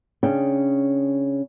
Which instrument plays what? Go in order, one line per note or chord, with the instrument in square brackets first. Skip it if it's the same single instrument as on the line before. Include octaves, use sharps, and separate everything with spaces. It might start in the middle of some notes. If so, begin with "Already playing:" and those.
[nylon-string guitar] C#3 C#4 D4 G#4 G5